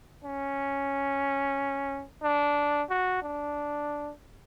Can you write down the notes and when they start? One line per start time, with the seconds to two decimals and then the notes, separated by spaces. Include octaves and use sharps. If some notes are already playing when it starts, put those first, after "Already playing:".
0.24 C#4
2.23 D4
2.89 F#4
3.22 D4